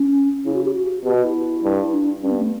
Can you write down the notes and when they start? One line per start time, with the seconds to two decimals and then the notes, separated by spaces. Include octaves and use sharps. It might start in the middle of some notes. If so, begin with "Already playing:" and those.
Already playing: C#4
0.45 C#3 E4
0.54 F#4
0.65 G4
0.74 F#4
1.05 B2 G4
1.15 F#4
1.24 E4
1.64 G2
1.82 E4
1.93 D4
2.23 G2 C#4
2.31 B3
2.40 A3